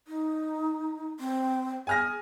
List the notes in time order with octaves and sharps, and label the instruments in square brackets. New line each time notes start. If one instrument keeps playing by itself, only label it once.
[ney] D#4
C4
[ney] G#4 [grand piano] G#5 F6 A#6